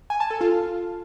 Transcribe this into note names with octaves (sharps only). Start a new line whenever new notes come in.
G#5
A5
A4
F4